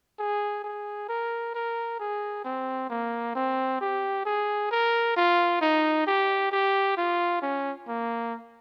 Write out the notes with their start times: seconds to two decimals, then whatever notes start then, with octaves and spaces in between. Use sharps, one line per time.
0.19 G#4
0.64 G#4
1.09 A#4
1.54 A#4
1.99 G#4
2.45 C4
2.90 A#3
3.35 C4
3.81 G4
4.26 G#4
4.71 A#4
5.17 F4
5.61 D#4
6.07 G4
6.52 G4
6.97 F4
7.42 C#4
7.88 A#3